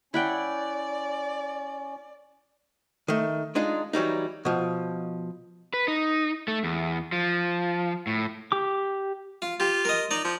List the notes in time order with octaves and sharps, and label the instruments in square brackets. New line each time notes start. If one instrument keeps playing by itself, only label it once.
[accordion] C#4 [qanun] E4 F#5 G5 [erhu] D5
[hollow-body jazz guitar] D#3 A3
G#3 D4 D#4 F4
E3 F#3 G3 D#4
B2 F3
[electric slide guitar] B4
D#4
A3
E2
F3
A2
[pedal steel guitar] G4 D6
[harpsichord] F4
[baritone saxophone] F4 [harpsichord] G4
[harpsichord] A#4 D#5
[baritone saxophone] D#4 [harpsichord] D5
[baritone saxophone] F3